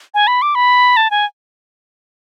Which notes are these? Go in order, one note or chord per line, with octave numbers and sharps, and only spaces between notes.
G#5
B5
D6
B5
A5
G#5